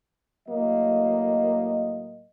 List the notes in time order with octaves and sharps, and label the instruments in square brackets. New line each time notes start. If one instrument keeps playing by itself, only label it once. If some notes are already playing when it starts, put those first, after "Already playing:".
[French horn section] A2 F#3 A#3 D#5